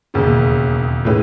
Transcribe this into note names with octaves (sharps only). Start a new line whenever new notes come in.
E1 D#2 C#3
A2 G#3 C#4 E4 B4